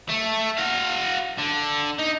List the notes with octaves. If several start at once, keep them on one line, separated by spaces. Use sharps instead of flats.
A3
F#4 F5
D3
D#4